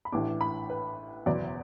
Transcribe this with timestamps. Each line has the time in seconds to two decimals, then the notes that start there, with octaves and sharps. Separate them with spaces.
0.05 B5
0.12 A1 A2 E3 D4 D6
0.41 B5
0.70 B4
1.26 F#1 E2 B2 F#3 D5